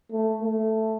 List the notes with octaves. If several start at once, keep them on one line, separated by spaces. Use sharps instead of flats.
A3
A3